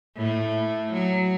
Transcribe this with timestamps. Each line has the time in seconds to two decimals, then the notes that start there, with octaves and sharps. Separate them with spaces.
0.17 A2 A3
0.92 F#3